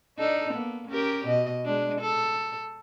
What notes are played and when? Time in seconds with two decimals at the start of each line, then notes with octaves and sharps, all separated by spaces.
0.17 D4 D#4 A4
0.53 A#3 B3
0.90 C#4 G4 A#4
1.26 B2 D#5
1.65 G#3 D4
2.01 A4